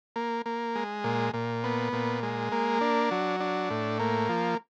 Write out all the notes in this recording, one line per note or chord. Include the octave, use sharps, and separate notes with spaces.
A#3
A#3
G#3
A#2
A#2
B3
A#2
G#3
A#3
D4
F#3
D4
A2
A#3
F3